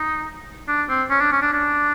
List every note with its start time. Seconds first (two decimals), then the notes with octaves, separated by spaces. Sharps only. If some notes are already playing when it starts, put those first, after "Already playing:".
Already playing: D#4
0.68 D4
0.89 C4
1.10 C#4
1.20 D4
1.32 C#4
1.42 D4
1.53 D4